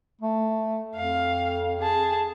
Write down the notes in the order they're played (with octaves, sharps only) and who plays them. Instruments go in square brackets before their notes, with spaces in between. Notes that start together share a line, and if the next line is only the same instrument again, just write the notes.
[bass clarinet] A3
[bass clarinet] F2 [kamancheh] F5
[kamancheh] G#4 A5